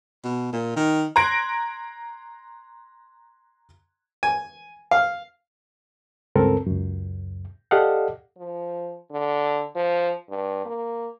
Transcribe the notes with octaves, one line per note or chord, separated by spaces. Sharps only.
B2
A#2
D#3
A#5 C6 F#6 G#6 A#6 D7
G#5
F5
C#2 G2 C4 A4 A#4
C#2 F#2
G4 A4 D5 D#5 F5 F#5
F3
D3
F3
G2
A#3